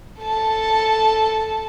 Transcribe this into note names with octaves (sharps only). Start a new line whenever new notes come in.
A4 A5